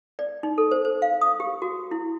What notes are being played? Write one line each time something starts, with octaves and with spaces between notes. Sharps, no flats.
D5
D#4
A4
C5
C5
F5
D#6
G4
F#4
E4